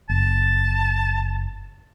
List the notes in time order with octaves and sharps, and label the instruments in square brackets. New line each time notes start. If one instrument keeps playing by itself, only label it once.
[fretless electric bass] F#1 [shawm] A5